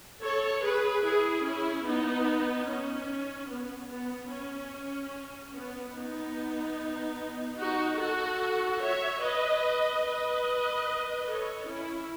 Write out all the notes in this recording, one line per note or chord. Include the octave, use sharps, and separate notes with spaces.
A4 C#5
G#4 B4
E4 G#4
C#4 E4
B3 D#4
C#4
B3
B3
C#4
B3
B3 D#4
D#4 F#4
F#4 A4
C#5 E5
B4 D#5
B4 D#5
A4 C#5
C#4 E4